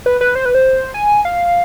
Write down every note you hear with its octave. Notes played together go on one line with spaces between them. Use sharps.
B4
B4
C5
B4
C5
G#5
F5